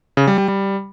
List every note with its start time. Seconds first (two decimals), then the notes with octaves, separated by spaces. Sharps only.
0.17 C#3
0.27 G3
0.38 G3
0.48 G3